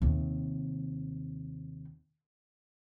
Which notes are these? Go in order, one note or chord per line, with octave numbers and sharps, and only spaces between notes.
D#2 C3